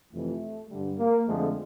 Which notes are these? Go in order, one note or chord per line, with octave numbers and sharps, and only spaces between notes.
F2 C3 E3 A3
G2 D3 G3
A#3
F2 D3 F3 G#3 A3